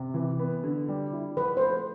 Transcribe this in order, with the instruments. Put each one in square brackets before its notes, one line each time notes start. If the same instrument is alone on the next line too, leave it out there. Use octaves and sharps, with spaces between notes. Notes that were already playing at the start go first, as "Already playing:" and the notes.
Already playing: [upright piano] C3
E3
B3
D3
G3
E4
[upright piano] F3 [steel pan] B4
[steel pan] C5
[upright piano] A3 [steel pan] B4